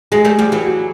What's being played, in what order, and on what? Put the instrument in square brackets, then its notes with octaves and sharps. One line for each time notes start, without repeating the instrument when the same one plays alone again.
[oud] F#3 G#3 [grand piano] G#4
[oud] G3 A3
[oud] F3 G3 [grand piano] G4
[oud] E3 F#3
[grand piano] F#4